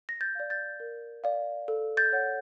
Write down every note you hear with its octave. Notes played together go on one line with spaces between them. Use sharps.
A#6
G6 A6
D5 F5
G6 A6
A#4
D5 F5
A4
G6 A6
C#5 F#5